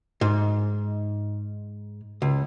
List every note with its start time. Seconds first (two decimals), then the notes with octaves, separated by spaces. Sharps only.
0.21 G#2
2.22 C#2